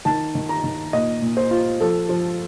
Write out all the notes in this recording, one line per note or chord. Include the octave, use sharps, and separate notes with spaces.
D#3 A5
D#3
A#5
D#3
A#2 D#5
A#2
C5
F4
F3 A4
F3